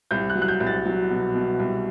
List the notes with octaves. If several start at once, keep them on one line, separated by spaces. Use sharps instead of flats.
C2 G6
F#6
F#3
F#6
G6
C2
A6
F#3
B2
B2
C2